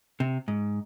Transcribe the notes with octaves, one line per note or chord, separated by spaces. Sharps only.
C3
G#2